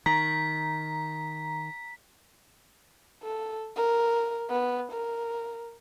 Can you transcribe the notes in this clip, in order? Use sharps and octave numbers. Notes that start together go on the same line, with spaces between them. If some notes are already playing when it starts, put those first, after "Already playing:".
D#3 A#5 B6
A4
A#4
B3
A#4